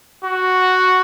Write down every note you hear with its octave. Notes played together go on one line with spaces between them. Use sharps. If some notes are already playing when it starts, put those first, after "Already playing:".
F#4